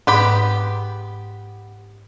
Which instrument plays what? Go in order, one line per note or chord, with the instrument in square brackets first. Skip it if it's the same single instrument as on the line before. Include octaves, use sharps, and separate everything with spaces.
[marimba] G#2 [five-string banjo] B3 G4 B5